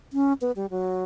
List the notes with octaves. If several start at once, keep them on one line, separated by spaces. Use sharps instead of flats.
C#4
B3
G3
F#3